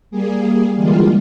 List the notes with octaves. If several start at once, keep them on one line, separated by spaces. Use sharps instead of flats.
G3 A#3 G#4
D3 E3 G3 G#3 A#3 F4